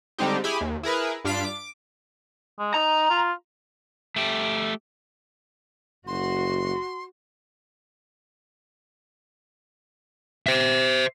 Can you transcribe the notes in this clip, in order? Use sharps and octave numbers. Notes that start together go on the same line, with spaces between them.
D3 G3 G#3 C4 D#4 G4
E4 G4 G#4 G#5 B5
D#2
E4 G#4 A#4 B4
G2 D4 F4 F5 B6 D7
D6
G#3
D#4 A#5
F4
A3 G4
F#1 F#4 C6
C5 E5